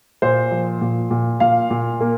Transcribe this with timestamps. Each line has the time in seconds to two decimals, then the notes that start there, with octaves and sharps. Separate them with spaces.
0.22 A#2 C5
0.51 F3
0.81 A#2
1.11 A#2
1.40 A#2 F5
1.70 A#2
2.00 A#3